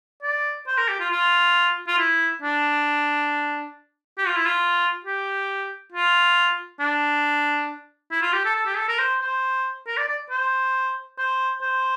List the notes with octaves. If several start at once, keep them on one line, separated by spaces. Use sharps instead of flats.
D5
C5
A#4
G4
F4
F4
F4
E4
D4
G4
F4
E4
F4
G4
F4
D4
E4
F4
G4
A4
A4
G4
A4
A#4
C5
C5
A#4
D5
D5
C5
C5
C5